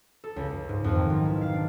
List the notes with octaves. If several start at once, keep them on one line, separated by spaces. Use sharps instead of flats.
A4
C#2
C#2
G#2
F2
D#3
B1
E4
F5
D4